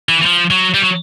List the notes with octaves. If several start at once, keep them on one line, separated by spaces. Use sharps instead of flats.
E3
E3
F3
F#3
G3
F#3